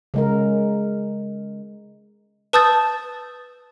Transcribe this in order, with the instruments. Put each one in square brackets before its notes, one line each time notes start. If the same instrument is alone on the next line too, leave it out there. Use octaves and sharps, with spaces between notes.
[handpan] C#3 G#3 A#4
[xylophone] B4 A5 D#6 E6 G6 A6